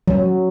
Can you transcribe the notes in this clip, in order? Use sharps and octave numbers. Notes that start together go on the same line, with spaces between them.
F#3